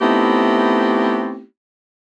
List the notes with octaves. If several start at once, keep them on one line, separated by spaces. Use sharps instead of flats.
A3 B3 C4 D#4 E4 G4